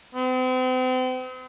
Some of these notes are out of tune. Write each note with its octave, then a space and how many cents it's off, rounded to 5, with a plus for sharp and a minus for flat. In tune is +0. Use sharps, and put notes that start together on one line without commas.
C4 -40